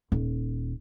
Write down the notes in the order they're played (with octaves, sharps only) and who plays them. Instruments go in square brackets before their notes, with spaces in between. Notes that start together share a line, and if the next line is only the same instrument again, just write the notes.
[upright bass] D#1